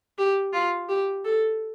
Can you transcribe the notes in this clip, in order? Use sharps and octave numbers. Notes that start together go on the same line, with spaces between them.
G4
F4
G4
A4